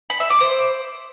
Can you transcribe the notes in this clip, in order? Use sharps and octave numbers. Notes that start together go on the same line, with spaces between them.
B5
E5
D6
C5